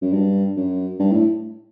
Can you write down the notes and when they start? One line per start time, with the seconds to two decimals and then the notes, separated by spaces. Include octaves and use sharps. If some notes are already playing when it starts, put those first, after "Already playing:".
0.01 F#2
0.13 G2
0.56 F#2
0.99 G2
1.12 A2